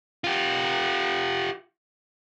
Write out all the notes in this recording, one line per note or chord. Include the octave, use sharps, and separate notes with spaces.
F4 G4